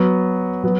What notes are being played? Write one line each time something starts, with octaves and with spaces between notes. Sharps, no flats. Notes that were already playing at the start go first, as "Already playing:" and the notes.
Already playing: F#3 B3 F#4
F#3 B3